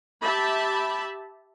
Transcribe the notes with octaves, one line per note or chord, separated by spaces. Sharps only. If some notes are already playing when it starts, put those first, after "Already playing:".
G4 E5 A5 B5